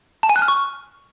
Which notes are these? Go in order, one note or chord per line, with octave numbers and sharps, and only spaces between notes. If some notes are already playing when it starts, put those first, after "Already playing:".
A5
G#5
F#6
F6
C#6